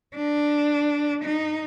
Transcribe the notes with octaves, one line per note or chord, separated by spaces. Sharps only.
D4
D#4